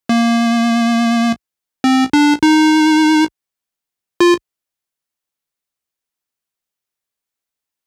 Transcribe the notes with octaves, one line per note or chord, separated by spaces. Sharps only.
A#3
C4
D4
D#4
F4